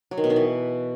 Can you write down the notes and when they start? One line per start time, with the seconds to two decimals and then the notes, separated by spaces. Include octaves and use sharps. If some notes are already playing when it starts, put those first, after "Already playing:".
0.11 F#3
0.18 D#3
0.24 B2
0.30 D#3
0.36 E3